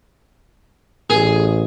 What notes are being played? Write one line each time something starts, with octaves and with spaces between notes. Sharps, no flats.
A1 G#4